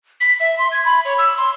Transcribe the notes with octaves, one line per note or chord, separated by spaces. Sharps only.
B6
E5
C6
G#6
B5
C#5
E6
C6